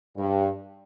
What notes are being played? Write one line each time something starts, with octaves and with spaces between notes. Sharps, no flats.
G2